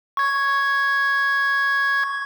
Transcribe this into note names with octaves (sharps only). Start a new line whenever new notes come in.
C#6 G#6